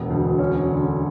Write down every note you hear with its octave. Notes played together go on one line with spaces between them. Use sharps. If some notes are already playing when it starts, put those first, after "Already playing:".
Already playing: E1 B3
D2
C#4
D3